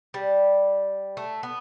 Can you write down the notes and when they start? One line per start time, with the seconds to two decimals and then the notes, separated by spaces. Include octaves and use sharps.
0.14 G3
1.17 A3
1.43 B3